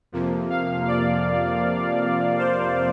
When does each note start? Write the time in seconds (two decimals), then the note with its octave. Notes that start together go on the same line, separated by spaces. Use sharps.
0.12 F2 C3 F3 A#3
0.50 F5
0.87 D5
2.38 C5